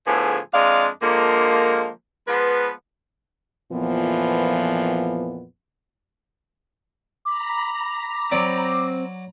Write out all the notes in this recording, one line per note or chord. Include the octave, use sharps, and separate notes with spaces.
A2 D3 F3 B3 G#4
F2 G#3 D4 D5 D#5 F5
D3 F3 G#3 A#3
F3 G#3 B3 B4
F2 A#2 E3 F3 B3
A#5 B5 D6
F#3 C4 D5